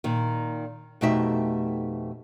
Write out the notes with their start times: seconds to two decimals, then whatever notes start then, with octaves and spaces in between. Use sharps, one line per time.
0.04 A#2 D#3
1.01 F2 B2 A3 D#4 G4 E5